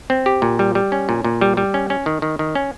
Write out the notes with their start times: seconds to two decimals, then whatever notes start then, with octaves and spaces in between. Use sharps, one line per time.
0.10 C4
0.26 G4
0.42 A#2
0.59 G3
0.75 G3
0.92 C#4
1.09 A#2
1.24 A#2
1.41 G3
1.57 G3
1.74 C#4
1.90 C#4
2.06 D#3
2.22 D#3
2.39 D#3
2.55 C#4